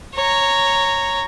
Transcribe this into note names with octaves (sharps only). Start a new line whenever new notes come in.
C#5 A#5